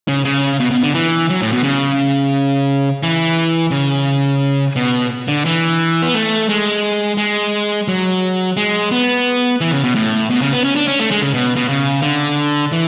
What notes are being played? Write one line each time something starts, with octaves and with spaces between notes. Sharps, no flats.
C#3
C#3
B2
B2
D3
E3
F#3
A2
B2
C#3
E3
C#3
B2
D3
E3
B3
A3
G#3
G#3
F#3
G#3
B3
E3
C#3
B2
A2
B2
C#3
B3
C#4
D4
C#4
A3
G#3
C#3
B2
B2
C#3
D3
E3